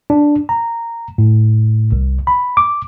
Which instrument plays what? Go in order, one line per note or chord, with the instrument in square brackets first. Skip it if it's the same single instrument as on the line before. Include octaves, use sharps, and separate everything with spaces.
[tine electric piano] D4
A#5
A2
C2
B5
D6